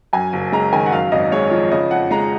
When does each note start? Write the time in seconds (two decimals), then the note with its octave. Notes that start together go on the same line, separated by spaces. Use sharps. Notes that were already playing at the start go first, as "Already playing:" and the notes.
0.13 F#2 G#5
0.33 F#1
0.52 G#3 A#5
0.72 D#3 G#5
0.86 F#5
0.92 F#2 F5
1.12 G#1 D#5
1.32 G#3 C#5
1.51 F3
1.71 C#3 D#5
1.91 F2 F#5
2.11 G#3 A#5